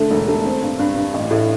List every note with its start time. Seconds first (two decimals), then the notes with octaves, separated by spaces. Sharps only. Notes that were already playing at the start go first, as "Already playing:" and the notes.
Already playing: D3 A3
0.11 E1
0.28 A3
0.46 C4
0.62 G2
0.79 G2
0.96 G2
1.14 A1
1.31 A2